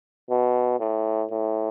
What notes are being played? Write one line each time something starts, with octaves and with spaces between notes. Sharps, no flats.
B2
A2
A2